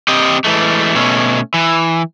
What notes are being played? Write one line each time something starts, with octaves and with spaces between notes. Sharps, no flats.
C4 G4 D#5
E3 G#3 A3
B2 A3 C#4
E3